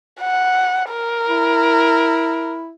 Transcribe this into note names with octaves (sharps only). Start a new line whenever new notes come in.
F#5
A#4
E4